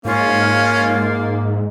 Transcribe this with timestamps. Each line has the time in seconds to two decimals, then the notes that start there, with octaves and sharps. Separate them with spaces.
0.05 G#2 A#3 C#4 F4